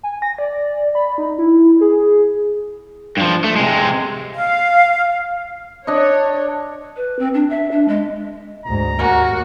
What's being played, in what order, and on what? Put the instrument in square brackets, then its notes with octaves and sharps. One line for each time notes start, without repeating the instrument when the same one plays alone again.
[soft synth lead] G#5
A#6
D5
B5
D#4
E4
G#4
[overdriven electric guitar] G2 F3
A3
C3 G#3
[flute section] F5
[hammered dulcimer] D4 D#5 [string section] C#5
[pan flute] B4
C4
D4
E5
D4
G#3
[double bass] D2 G#2 [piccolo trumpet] A#5
[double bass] D#2 A#3 [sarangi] F#4 [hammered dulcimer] A#4 G#5 C#6